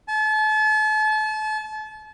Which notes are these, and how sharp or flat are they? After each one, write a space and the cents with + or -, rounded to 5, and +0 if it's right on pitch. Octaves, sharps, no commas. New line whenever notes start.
A5 -35